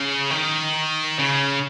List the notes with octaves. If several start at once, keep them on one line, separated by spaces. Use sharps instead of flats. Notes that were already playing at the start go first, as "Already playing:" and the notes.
Already playing: C#3
D#3
C#3